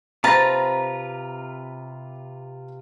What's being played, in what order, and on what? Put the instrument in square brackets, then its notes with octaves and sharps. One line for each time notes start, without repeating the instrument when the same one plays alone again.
[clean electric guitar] C3 F4 B4 [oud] C4 D#4 [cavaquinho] A5 [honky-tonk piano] A#5 A#6